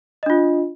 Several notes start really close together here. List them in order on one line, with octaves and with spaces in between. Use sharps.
D#5 D4 F4